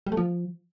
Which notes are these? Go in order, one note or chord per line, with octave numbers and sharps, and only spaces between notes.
G3
A3
F3